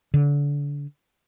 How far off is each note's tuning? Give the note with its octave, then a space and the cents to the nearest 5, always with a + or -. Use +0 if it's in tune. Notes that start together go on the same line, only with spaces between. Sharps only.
D3 -30